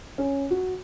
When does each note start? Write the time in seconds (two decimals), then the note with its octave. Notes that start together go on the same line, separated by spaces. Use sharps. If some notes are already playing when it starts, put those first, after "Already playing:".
0.18 C#4
0.51 F#4